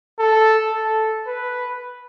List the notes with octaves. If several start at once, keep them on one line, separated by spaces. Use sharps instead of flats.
A4
A4
B4